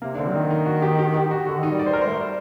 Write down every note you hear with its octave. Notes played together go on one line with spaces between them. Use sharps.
C3 A#3
D4
D3 C4
F#3
D#3 D#4
D#4
F#4
G4
G4
G4
F#4
D3 F#4
D#3 D#4
G3
D5
C5
G3 A#4
C5
A3
G3